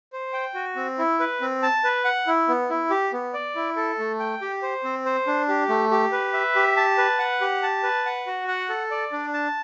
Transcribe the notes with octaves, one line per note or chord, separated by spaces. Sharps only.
C5
G5
F#4
C4
E4
B4
C4
A5
B4
F#5
E4
B3
E4
G4
B3
D5
E4
A4
A3
G5
G4
C5
C4
C5
D4
G4
A3
G4
B4
E5
G4
A5
B4
F#5
G4
A5
B4
F#5
F#4
F#5
A4
D5
D4
A5